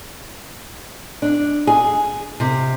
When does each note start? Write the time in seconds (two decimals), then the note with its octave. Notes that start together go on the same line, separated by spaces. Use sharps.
1.22 D4
1.67 G#4
2.40 C3